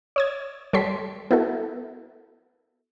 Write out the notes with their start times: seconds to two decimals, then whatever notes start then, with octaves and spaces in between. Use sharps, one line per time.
0.16 C#5 D#6 G#6
0.73 G3 A4 C#5 C6 B6
1.31 B3 E4 F#4 A4